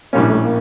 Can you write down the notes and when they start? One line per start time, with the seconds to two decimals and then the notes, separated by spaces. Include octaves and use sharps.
0.13 A#1 A2 G3 A#3 C#4
0.30 A3
0.45 A#3